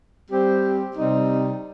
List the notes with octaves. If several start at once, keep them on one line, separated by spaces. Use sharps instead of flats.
G3 C4 G4 C5
C3 G3 C4 D#4